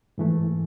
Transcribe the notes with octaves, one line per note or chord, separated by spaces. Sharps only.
G#2 E3 A3